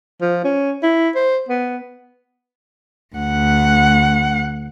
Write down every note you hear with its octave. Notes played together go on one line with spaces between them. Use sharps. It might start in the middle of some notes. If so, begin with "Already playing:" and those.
F3
C#4
E4
C5
B3
D2 F#5